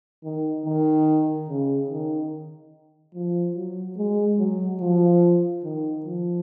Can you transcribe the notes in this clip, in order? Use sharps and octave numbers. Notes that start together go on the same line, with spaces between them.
D#3
D#3
C#3
D#3
F3
F#3
G#3
F#3
F3
D#3
F3